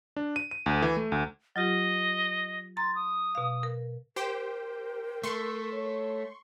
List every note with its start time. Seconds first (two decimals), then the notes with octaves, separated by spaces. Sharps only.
0.17 D4
0.36 D#7
0.51 D#7
0.66 D2
0.82 E3
0.97 A3
1.12 D2
1.56 F#3 F4 G4 D#5
2.77 A#5 C6 A6
2.95 D#6
3.35 B2 F5
3.63 A#4
4.16 G4 A#4 C5 G5
5.23 A3 C6 C#6
5.74 C#5